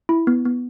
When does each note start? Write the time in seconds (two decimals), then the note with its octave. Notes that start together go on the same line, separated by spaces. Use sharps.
0.09 E4
0.27 B3
0.45 B3